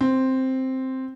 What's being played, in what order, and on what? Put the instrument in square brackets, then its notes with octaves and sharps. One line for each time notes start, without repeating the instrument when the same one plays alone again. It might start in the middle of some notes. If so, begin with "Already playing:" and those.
[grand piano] C4